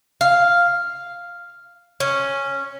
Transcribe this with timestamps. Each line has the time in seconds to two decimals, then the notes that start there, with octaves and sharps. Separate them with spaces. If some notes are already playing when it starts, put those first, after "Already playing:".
0.21 F5
2.00 C#4